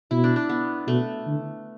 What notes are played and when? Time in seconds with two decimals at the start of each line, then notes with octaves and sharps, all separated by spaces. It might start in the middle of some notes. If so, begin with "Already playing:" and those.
0.11 B2 E4
0.24 D4
0.36 D4
0.49 B3
0.87 B2 A3
1.27 D3